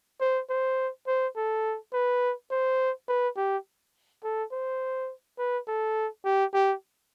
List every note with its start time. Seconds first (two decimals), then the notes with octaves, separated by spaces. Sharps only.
0.21 C5
0.49 C5
1.07 C5
1.36 A4
1.93 B4
2.50 C5
3.08 B4
3.37 G4
4.24 A4
4.52 C5
5.38 B4
5.67 A4
6.25 G4
6.54 G4